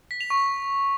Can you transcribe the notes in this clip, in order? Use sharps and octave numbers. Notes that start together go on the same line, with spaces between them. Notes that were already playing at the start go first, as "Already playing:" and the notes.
B6
F7
C#6